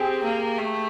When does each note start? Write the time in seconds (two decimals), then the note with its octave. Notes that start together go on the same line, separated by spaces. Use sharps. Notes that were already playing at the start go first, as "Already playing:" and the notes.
Already playing: C4 G4 G#4
0.23 A#3
0.58 A3